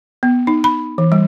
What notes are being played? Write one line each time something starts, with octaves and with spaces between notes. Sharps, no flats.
B3
D#4
B5
E3
G3